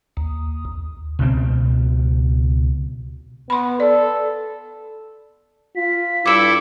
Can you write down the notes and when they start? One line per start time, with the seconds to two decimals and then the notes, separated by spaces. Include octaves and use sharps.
0.17 D#2
1.19 C#2 B2 C4
3.50 B3 B5 C6
3.80 A4 D5
5.76 F4 B6
6.26 G2 E4 A4 D6 E6